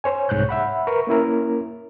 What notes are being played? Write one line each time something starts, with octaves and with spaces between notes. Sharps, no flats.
C5 C#5 G#5
C2 G#2 C#5 F#6 G6
E5 F#5 B5
A#4 B4 C#6
A#3 C#4 E4 A#4